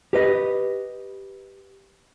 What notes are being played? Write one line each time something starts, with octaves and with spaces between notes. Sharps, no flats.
G4 B4 D#5